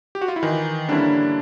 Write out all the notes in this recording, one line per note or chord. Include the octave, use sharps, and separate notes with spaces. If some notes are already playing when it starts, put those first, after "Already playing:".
G4
F#4
F4
E4
D#3 E3 D#4
D3 G3 A#3 C#4 D4 E4